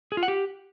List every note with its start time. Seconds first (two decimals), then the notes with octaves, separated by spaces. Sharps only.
0.12 G#4
0.17 F4
0.23 F#5
0.28 G4